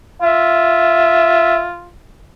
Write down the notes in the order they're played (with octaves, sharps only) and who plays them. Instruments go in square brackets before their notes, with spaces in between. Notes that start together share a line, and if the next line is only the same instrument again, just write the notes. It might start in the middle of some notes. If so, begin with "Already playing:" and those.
[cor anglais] F4 [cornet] E5